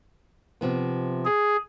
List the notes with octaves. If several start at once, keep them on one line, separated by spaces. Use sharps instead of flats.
C3 F3 B3
G#4